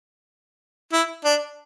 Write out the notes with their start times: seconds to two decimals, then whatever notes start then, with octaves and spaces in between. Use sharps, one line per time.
0.92 E4
1.24 D4